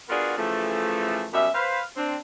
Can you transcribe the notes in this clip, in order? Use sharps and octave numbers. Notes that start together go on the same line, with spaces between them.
B3 D4 F4 F#4 G#4 A#4
C#3 E3 F3 A3
F#2 B2 G3 C#4 E5
B4 C5 F5
C4 D4